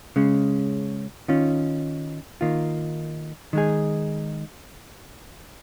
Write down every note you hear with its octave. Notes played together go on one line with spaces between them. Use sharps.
C#3 G#3 C#4
D#3 C#4 F4
D#3 A#3 F4
D#3 G#3 D#4 G#4